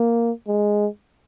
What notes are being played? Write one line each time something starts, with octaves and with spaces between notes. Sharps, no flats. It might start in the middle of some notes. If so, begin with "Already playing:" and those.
Already playing: A#3
G#3